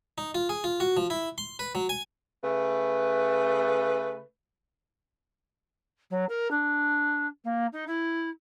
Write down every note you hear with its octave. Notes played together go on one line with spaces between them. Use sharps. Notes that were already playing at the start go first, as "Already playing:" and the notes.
D#4
F4
G#4
F4
F#4
F3
E4
C6
B4
F#3
G#5
C#3 A3 B4
F#3
A#4
D4
A#3
D#4
E4